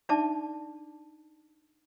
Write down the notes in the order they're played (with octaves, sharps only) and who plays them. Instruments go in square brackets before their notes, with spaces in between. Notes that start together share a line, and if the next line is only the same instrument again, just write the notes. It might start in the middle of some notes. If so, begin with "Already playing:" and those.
[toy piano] D4 D#4 D5 E5 A5 D6